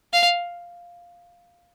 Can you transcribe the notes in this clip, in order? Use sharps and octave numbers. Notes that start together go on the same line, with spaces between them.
F5